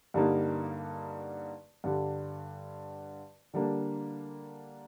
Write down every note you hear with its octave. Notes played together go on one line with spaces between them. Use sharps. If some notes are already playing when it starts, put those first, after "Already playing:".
G2 D3 G3 A#3 D#4
G2 D3 G3
D3 G3 A#3 D4